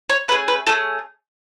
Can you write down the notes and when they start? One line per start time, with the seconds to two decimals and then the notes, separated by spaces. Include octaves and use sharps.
0.10 C#5
0.28 A3 C#4 G#4 B4
0.48 B4
0.67 A3 C#4 G#4 A4